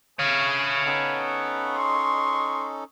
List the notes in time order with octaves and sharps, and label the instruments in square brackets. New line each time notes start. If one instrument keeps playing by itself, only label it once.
[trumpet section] A3 G#4 B4 [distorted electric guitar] C#5 F5
[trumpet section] B3 [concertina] C#4 D#4 A4
[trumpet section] G#3 C#6 D#6 [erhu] C6